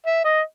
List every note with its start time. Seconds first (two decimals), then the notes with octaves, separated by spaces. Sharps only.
0.06 E5
0.24 D#5